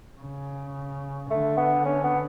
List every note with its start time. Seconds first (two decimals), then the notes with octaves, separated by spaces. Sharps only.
0.20 C#3
1.30 D3 A3
1.57 B3
1.85 C#4
2.04 B3